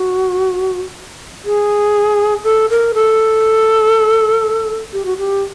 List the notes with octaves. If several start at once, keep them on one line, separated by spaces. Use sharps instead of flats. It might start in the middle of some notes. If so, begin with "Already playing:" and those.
Already playing: F#4
G#4
A4
A#4
A4
G4
F#4
G4